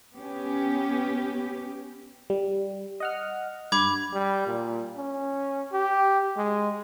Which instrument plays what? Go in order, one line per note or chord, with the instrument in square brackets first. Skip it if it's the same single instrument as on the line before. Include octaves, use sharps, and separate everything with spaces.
[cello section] B3 C#4 G4
[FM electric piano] G3
D#5 F#5 F6
[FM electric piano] G2 [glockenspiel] B5 D6 G#6
[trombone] G3
A#2
C#4
G4
G#3